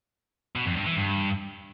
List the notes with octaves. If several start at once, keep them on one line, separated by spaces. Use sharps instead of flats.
B2
F2
G2
E3
G2